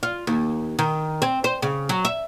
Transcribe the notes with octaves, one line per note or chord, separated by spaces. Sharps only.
F4
D#2
D#3
C4
C5
C#3
F#3
E5